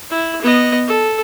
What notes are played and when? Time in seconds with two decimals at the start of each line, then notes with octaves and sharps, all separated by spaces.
0.10 E4
0.42 B3 D#5
0.88 A4